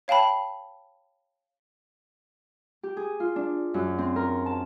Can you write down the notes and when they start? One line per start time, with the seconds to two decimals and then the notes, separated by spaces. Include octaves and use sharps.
0.08 C#5 F5 G5 A5 B5
2.83 G4
2.97 G#4
3.20 F4
3.36 D4
3.74 F#2
3.98 C4
4.16 A#4
4.46 A5